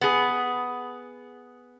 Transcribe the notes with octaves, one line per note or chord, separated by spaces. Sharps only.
B3 G#4